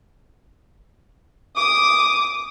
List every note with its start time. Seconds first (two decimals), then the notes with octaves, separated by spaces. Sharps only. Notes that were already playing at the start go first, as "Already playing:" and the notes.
1.56 D6 D#6